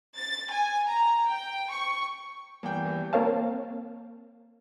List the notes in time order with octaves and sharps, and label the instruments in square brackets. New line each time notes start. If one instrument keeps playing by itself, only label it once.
[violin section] A6
G#5
A#5
G5
C#6
[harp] E2 G2 G6 [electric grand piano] A#3 G5
[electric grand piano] E3
[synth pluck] A#3 C4 A#4 C#5 F5 A5